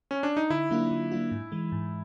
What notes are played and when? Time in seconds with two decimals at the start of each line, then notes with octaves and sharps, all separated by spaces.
0.11 C#4
0.23 D4
0.37 D#4
0.50 D3 E4
0.71 F#3 A#3 D4 F4
0.91 D3
1.12 F#3 A#3 D4 F4
1.31 G#2
1.52 E3 G#3
1.72 G#2